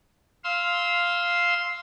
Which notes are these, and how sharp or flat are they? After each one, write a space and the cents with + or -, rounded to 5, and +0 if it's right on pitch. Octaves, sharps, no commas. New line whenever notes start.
F5 +0 C6 +0 E6 -25